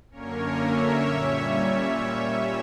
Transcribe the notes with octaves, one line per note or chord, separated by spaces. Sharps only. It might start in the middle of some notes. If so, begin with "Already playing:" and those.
F#2 D3 A#3 C#4 A#4 C#5
C#5 E5
A#2 G3 C#4